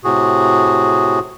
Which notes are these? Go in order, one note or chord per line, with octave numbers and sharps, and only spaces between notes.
A2 C3 F#4 G#4